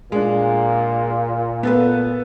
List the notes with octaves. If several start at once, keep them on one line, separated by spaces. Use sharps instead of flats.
A#2 G#3 D4
B3 A4 B4